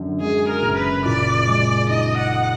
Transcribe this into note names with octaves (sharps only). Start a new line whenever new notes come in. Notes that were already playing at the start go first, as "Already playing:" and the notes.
Already playing: F#2 D3
G#3 G#4
A#4
F#1
B4
A#2 D5
G#3
D#4 D#5
F#5